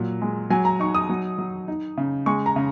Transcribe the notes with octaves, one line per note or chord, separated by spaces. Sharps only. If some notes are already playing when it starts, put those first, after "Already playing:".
Already playing: A#2 F#3
G#3
F#3 G#5
A#5
D#4 C#6
D#6
F#3
F#3
D#4
C#3
G#3 C#6
A#5
C#3